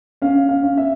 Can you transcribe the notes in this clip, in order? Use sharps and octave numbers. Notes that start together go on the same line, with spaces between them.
C#4 F5
F5
C#4
E5